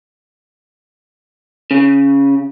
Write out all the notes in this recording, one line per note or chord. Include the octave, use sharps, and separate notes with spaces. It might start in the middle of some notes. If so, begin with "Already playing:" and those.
C#3